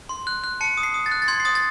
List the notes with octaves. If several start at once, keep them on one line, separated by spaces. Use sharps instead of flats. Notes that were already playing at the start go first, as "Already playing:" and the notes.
C6
F#6
F#6
A5 C#7
D#6
C7
D#6
A6
F#6
A6
C6 G#6
C7
D#6 A6
A6